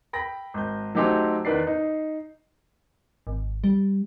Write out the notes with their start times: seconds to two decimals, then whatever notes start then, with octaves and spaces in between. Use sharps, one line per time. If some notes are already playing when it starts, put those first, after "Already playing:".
0.13 G5 B5 A#6
0.54 G#1 G6
0.95 F#3 A3 D#4 G4 G#4 C5
1.45 E2 D#3 B4 D5 C7
1.67 D#4
3.27 G#1
3.64 G3